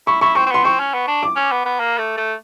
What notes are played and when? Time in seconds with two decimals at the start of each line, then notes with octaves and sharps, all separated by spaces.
0.07 E4 C#6
0.21 E4 C#6
0.35 C4 C#6
0.46 C4
0.51 B3 C6
0.64 C4 C#6
0.80 C#4
0.94 B3
1.08 D4
1.23 D6
1.36 C#4
1.51 B3
1.65 B3
1.80 A#3
1.98 A3
2.17 A3